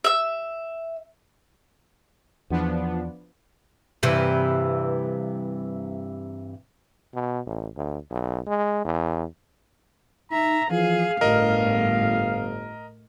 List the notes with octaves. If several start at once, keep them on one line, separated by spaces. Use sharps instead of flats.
E5 E6
E2 F3 B3 D4
G2 C3 E3
B2
A1
D2
B1
G#3
E2
D#4 E5 A#5
E3 F3 G#4 F5
G1 A2 A#4 D#5